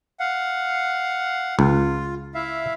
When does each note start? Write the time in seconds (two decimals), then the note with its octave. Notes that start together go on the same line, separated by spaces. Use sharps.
0.20 F5 F#5
1.59 C#2 F4
2.35 E4 E5 F5